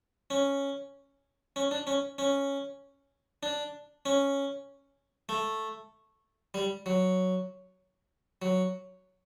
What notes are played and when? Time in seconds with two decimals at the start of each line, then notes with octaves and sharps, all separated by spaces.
0.30 C#4
1.56 C#4
1.71 D4
1.87 C#4
2.18 C#4
3.43 D4
4.06 C#4
5.29 A3
6.54 G3
6.86 F#3
8.42 F#3